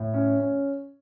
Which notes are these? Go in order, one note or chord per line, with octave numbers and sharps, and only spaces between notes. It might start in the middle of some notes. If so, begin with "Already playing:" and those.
Already playing: A2
C#4
C#4